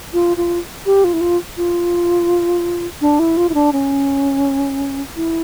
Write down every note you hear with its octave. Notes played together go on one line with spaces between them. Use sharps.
F4
F4
G4
F4
E4
F4
F4
D4
E4
F4
E4
D4
C#4
E4